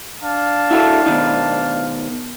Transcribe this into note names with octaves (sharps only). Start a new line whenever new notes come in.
D4 F5 A5
E4 F#4 A4
B2 D#3 D#4